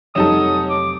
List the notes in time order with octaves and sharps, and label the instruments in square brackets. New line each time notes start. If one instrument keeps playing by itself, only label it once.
[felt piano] F1 G3 E7 [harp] F#3 [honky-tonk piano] C#4 D#4 A4 [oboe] D#6
[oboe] D6